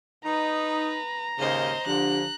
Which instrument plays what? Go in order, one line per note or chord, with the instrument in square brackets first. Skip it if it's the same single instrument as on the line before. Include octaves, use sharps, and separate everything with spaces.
[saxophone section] D#4 [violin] B4 [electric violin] A#5
[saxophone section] D#2 G#2 C#3 [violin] C5 D#5
[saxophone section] D3 F3 [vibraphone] D4 G4 [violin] F#6